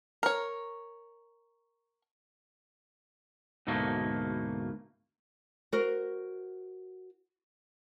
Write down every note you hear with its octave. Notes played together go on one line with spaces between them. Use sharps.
A#4 C#5
D2 G#2 B2 A3 A#3
F#4 A#4 C5